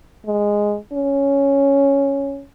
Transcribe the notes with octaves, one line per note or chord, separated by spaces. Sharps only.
G#3
C#4